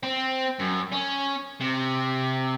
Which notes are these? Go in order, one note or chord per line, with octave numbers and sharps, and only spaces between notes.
C4
F#2
C#4
C3